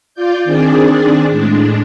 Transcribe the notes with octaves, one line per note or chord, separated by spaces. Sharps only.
F4 D5 G6
D#3 C4 D4 G#4 D5
A2 G#3 D4